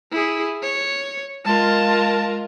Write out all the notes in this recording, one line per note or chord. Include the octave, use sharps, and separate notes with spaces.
E4 G#4
C#5
G#3 F4 A#4 A5